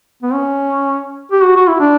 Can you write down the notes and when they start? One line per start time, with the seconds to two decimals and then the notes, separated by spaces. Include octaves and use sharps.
0.23 B3
0.34 C#4
1.32 G4
1.44 F#4
1.56 F#4
1.68 E4
1.80 D4